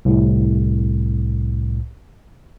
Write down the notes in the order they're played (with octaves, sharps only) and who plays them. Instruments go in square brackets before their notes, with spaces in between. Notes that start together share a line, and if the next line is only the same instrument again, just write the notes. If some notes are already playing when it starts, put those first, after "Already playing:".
[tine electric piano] C2 A2